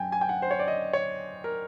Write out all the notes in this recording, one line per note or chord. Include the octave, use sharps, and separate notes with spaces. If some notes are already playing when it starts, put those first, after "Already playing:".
Already playing: F#2 G5 G#5
G#5
G5
F#5
C5
C#5
D5
D#5
C#5
A#4